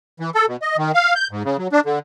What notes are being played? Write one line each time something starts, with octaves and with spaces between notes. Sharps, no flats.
E3
A4
B2
D#5
D#3
F5
G6
G#2
C#3
F#3
D4
D3